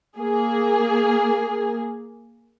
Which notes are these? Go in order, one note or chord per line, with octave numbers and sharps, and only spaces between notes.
A#3 G#4